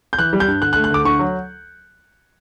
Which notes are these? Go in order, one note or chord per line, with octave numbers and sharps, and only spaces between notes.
G6
E3 F#6
G3
G6
G2
D3 F#6
F#6
A3
F#6
D2 D6
D3 C#6
F#3